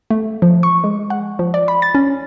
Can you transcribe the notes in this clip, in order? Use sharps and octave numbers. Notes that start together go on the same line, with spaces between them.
A3
F3
C#6
G#3
F#5
F3
D5
B5
A6
C#4